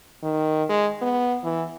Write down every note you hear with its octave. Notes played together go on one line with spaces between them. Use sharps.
D#3
G#3
B3
E3